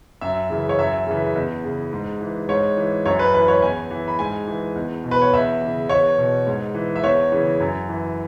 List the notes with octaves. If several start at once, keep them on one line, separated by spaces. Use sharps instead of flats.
F#2 E5
C#3 E3
C#5
F#2 E5
C#3 E3
E2
C#3 E3
G#2
E3
G#2 C#5
E3
F#2 C#5
B4
E3 B4
C#5
E2 G#5
E3
B5
G#2 G#5
E3
E2
B2
B4
C#5
E2 E5
C#3 E3
E2 C#5
B2
G#2
E3
E5
E2 C#5
C#3 E3
F#2
E3